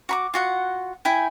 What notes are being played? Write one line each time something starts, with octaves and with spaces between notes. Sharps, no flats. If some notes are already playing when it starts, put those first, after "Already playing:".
F#4 B5 D6
F4 F#4 F#5
E4 G5 G#5